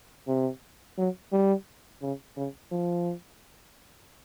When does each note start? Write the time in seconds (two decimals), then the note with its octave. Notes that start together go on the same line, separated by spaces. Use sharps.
0.28 C3
0.98 F#3
1.32 G3
2.02 C#3
2.37 C#3
2.72 F3